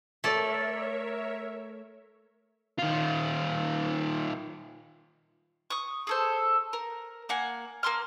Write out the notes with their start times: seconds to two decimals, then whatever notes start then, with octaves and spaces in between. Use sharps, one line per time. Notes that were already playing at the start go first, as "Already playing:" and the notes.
0.24 A3 A#4 C#5 D5 E5
2.79 D#3 F4
5.70 C#6 D#6
6.07 G#4 A4 C5
6.73 A#4
7.29 A#3 F#5 G#5
7.83 A#3 B3 C6 F6